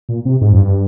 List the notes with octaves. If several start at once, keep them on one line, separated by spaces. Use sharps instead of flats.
A#2
C3
G#2
F2
G2